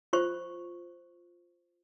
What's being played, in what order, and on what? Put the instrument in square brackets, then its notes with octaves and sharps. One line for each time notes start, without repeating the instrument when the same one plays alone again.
[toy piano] F4 C5 C#6